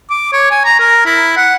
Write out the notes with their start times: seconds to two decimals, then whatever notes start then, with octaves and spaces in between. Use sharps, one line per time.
0.10 D6
0.33 C#5
0.51 G#5
0.65 A#5
0.80 A#4
1.06 E4
1.37 F#5